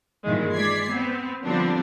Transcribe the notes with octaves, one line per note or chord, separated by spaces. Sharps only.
G2 A#2 D#3 E3 G#3
G#3 D5 G#6 B6 C7
B3 C4
D3 F3 G3 B3 C4 D4